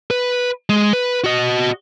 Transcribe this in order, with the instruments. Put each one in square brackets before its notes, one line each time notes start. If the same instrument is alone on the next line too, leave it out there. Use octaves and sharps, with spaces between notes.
[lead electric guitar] B4
G#3
B4
F#4 D#5